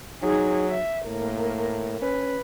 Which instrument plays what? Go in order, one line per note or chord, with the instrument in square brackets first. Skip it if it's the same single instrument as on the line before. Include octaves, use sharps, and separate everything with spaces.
[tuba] F#3 [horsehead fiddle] D#4 G#4
[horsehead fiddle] E5
[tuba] A2 [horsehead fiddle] A#3 A#4
[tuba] C#4 [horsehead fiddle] B4